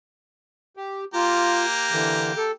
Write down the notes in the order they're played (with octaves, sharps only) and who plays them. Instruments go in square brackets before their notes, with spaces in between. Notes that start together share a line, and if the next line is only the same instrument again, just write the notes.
[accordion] G4
[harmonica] A#3 G4 A#5 [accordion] F4
[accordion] D3 E3
A4